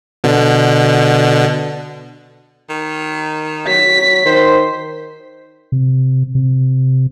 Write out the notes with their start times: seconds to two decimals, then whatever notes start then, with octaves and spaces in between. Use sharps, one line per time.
0.24 B2 D3
2.70 D#3
3.67 F#3 B6
4.25 D#3 C5
5.72 C3
6.35 C3